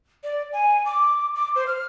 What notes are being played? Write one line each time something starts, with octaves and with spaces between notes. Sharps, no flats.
D5
G#5
D6
D6
C5
F6